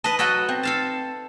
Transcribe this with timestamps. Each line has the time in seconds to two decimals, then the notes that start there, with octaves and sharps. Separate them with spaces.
0.04 B4 D#5 A5
0.19 F#3 F#4 A4 D#5 G5
0.49 C4
0.63 A4 F5 A5